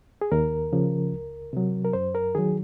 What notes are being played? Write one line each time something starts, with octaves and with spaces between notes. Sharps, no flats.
G#4
D#2 A#4
C#3 F3
C#2
C3 F#3
A#4
F#2 C5
A#4
D#3 F#3 G#4